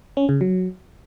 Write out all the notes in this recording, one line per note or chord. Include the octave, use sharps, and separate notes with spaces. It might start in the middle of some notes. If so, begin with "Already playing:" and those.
C#4
C#3
F#3